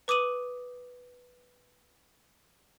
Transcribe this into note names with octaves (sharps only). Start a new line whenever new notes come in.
B4 D6 D#6 D#7 F#7